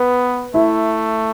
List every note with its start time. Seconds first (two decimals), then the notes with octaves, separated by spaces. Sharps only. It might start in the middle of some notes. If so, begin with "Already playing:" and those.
Already playing: B3 B4
0.54 A3 E4